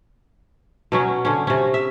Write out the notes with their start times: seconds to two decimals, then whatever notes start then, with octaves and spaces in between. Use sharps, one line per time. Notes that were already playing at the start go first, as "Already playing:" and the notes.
0.92 B2 F#3 C#4
1.25 D3 C#4
1.47 C3 C#4
1.74 E5